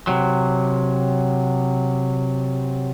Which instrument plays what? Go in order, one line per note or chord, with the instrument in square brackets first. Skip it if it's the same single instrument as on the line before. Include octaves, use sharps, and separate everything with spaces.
[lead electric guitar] C3 F#3